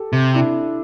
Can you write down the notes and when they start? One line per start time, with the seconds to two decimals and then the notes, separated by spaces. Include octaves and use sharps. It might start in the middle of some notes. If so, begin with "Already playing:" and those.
Already playing: G4 A4
0.13 C3
0.34 D4 E4